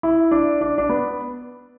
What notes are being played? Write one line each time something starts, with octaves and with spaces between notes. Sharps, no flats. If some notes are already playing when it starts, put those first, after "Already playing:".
E4
D4
D4
D4
B3